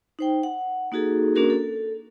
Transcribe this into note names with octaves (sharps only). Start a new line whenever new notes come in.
D#4 C5 G5
F#5
A#3 D#4 F#4 G#4 A4
A#3 C#4 D4 F#4 G#4 A#4
A4